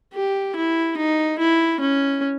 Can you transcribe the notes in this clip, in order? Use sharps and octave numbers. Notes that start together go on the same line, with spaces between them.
G4
E4
D#4
E4
C#4